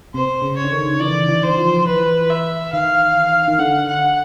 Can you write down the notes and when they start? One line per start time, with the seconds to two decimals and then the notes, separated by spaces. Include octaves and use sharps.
0.14 C3 C5
0.42 C#3
0.56 C#5
0.64 D3
0.72 D#3
1.00 E3 D5
1.29 E3
1.43 C5
1.58 F3
1.86 E3 B4
2.30 E5
2.73 D#3 F5
3.48 D#3
3.59 D3 F#5
3.88 F#5